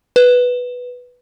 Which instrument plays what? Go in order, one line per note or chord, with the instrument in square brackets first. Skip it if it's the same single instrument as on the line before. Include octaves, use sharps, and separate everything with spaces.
[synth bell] B4